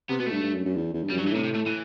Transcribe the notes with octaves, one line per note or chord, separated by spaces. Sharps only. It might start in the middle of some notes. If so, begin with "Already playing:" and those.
C3 B3
B2 B3
A3
G2
G2
F#2
F#2
E2
E2
G2
F#2 G3
F#3
G2
E3
A2 C3
C3
A3
E3